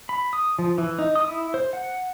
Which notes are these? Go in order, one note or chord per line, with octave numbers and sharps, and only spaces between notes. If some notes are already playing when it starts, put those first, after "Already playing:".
B5
D#6
F3
E3
D#4
D#6
E4
C5
F#5